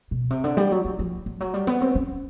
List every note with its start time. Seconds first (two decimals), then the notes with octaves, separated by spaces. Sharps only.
0.11 B2
0.30 C3
0.44 D3
0.57 G3
0.71 F#3
0.85 E3
0.99 F3
1.26 F3
1.40 F#3
1.54 G3
1.67 B3
1.81 C4
1.95 C#4